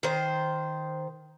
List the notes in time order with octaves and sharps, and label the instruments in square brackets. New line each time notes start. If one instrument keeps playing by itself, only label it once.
[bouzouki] D#3 C5